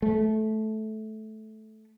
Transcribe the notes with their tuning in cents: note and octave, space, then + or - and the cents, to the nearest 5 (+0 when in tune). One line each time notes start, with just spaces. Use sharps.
A3 -15